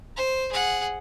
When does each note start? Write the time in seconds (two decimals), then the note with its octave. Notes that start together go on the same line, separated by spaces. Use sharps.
0.16 C5
0.52 G#4 F#5